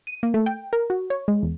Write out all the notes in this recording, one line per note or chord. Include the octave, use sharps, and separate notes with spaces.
D#7
A#3
A3
G5
A#4
F#4
C#5
G#3
E2